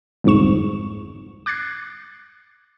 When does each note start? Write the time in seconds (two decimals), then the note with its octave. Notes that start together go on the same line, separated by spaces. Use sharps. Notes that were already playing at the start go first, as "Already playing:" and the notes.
0.24 G1 C2 F2 G#2 C#6 E7
1.46 D6 F#6 G#6 A6 C7